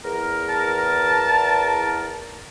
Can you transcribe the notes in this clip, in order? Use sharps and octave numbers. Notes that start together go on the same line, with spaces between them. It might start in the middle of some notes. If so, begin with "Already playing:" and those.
E2 A#4
A5